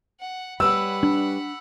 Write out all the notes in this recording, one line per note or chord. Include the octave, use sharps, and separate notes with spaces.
F#5
G3 B4 C#5 F#5 B5 E6
D4